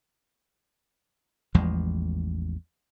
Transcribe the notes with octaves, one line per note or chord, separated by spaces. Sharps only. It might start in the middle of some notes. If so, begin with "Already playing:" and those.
A1 E2 F3 G#3